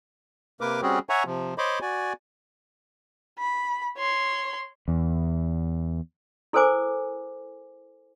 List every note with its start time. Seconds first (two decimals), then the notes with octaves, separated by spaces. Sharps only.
0.61 C3 A#3 A#4 B4 D6
0.82 G3 C4 C#4 F#4 G#4
1.09 C#5 E5 F#5 G#5 A#5 C#6
1.26 C3 F3
1.58 C5 C#5 D#5 B5 C6 D6
1.81 F#4 D5 G#5
3.38 B5
3.98 C#5 C6
4.88 E2
6.53 E4 A4 A#4 C5 G#5 D6